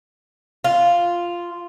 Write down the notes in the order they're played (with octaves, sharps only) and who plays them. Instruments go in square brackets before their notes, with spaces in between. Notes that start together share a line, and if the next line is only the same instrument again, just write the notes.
[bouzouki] F4